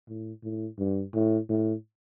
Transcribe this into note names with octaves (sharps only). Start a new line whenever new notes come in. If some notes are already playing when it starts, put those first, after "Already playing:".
A2
A2
G2
A2
A2